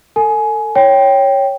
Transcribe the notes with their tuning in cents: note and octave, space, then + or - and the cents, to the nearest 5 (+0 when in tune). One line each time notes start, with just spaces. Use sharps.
A4 +30 G#5 +20
C#5 +0 G5 +0